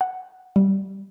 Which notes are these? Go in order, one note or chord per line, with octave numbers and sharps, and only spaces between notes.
F#5
G3